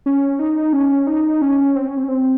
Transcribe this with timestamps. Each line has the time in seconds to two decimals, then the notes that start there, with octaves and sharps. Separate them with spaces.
0.06 C#4
0.39 D#4
0.73 C#4
1.07 D#4
1.42 C#4
1.76 C4
1.87 C#4
1.97 C4
2.04 C#4
2.09 C4